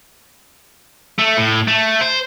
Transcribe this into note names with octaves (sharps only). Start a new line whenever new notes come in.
A3
A2
A3
C5